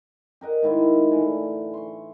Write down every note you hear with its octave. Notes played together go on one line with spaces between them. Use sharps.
G4 A#4 D#5 F#5
G#2 D#3 E4 F4
A2 D3 E3 C#5
C6 C#6